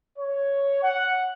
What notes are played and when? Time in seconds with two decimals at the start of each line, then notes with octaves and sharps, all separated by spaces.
0.18 C#5
0.82 F#5